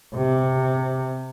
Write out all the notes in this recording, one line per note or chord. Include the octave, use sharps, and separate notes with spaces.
C3